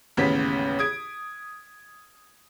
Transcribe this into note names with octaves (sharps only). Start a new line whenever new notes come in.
A1 D#2 C#3 B3 B6
D#6 G#6 D7